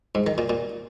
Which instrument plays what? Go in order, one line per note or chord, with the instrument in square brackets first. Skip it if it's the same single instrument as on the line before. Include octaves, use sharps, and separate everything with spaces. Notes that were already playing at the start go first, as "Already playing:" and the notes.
[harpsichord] G#2
D#3
A#2
A#2